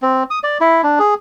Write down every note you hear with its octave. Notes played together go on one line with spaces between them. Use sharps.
C4
D#6
D5
E4
D4
G#4